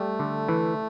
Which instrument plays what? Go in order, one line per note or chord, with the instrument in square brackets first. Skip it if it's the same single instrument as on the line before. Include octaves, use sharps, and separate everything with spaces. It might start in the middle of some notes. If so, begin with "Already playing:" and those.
Already playing: [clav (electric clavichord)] G3 [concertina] A3
[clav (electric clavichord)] D3
E3